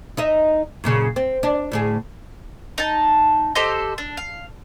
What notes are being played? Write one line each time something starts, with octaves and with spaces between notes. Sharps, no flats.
D#4 D#5 E5
F#2 A#2 C#3
C4
D4
D2 A2 G#4
D#4 A5
G4 A4 C5 D#5
D4
F5